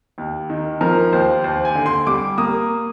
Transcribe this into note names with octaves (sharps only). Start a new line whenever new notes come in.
D#2
D#3
F3 A#4
D#2 C5
D#2 C5
G#5
D3
C6
G3 D6
A#3 D#6